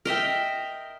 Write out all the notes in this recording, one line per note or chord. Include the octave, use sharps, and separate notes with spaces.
A#4 D#5 E5 G5